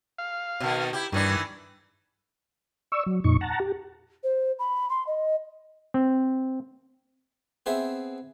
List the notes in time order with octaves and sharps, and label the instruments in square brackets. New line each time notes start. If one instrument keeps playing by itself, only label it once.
[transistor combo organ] F5
[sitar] B2 D#3
E4 G4
[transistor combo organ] G2 [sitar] D#3 E3 D4
[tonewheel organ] D5 C#6 E6
F#3
F2 A#2 D#4 C#6
F#5 A5 A#5
G4
[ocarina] C5
B5
C6
D#5
[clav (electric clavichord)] C4
[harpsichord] B3 C4 G#4 E5